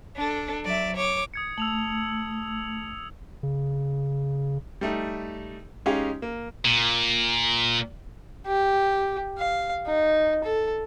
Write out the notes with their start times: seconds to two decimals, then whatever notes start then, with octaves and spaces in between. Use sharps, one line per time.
0.15 D4 A4
0.63 F#3 D5 E5
0.96 C#5 D6
1.34 D#6 G#6 C#7
1.58 A3 E6 F7 F#7
3.43 C#3
4.81 G3 A3 D#4
5.86 G#3 C#4 D#4 G4 F5
6.22 A#3
6.65 A#2
8.47 G4
9.38 F5
9.86 D#4
10.44 A4